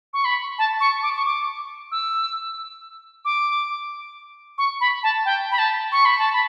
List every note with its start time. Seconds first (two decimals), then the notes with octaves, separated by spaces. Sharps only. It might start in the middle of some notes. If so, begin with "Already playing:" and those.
0.13 C#6
0.25 B5
0.58 A5
0.80 C#6
1.03 D6
1.16 C#6
1.25 D6
1.92 E6
3.25 D6
4.58 C#6
4.81 B5
5.03 A5
5.25 G5
5.52 B5
5.58 A5
5.92 C#6
6.05 B5
6.19 A5
6.33 B5